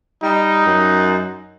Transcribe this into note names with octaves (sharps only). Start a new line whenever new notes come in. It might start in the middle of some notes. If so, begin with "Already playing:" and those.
G3 D#4
F#2